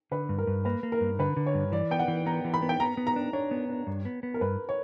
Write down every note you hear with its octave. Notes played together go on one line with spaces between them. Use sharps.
D3 B4
G2
A#4
G2
A#3 B4
A#3
A#4
G2
D3 B4
D3
C#5
G2
E3 D5
B3 G5
F#5
E3
B3 A#5
E3
B5
B3
G5
B3 A#5
B3
A#5
D4
D4 C#5
B3
D4
G2
B3
B3
A#4
G2 B4
C#5